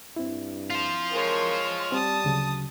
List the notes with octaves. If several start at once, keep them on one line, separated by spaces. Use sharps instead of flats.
G2 C4 E4
F4 C5
G#3 A#4 C#5
G3 C4 A5 D#6
D2 C#3 F#3